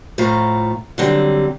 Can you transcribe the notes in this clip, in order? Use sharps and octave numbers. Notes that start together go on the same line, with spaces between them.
A2 F3 A3 F4 F5 A#5
D3 F#3 G3 C4